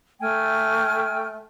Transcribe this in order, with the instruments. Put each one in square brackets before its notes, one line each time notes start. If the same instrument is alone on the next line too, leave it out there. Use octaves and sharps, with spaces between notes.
[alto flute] A3 [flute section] G5 G#5 F6